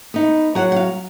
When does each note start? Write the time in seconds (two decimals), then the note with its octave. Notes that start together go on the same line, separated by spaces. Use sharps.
0.14 B3 D#4
0.55 F#3 F#5
0.72 F#5
0.76 F5